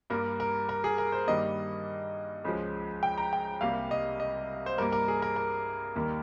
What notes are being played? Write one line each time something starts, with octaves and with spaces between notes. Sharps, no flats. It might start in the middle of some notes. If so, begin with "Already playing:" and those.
G2 G3 A#3 A#4
A#4
A#4
G#4
A#4
C5
G2 D#3 G3 A#3 D#5
C#2 C#3 F3 G#3
G5
A#5
G5
C2 C3 G3 A#3 F5
D#5
D#5
C5
G2 G3 A#3 A#4
A#4
G#4
A#4
A#4
D#2 D#3 G3 A#3